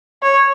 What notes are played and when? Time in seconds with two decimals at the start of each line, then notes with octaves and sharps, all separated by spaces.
0.23 C#5